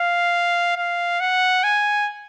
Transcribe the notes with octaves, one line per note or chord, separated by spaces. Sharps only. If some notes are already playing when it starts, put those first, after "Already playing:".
Already playing: F5
F5
F#5
G#5